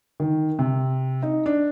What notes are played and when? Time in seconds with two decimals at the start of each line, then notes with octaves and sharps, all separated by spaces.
0.20 D#3
0.59 C3
1.22 D#4
1.46 D4